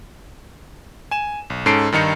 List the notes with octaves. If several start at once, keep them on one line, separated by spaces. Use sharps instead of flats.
G#5 E7
B1
G#2 C#4 A4 C7 D7
G2 D#3 D#4 C#7